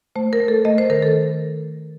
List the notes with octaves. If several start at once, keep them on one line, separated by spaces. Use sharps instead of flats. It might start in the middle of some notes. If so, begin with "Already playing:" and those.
A3 C5
A#4
A3
A4
A3 D#5
C5
D#3 A#4
A4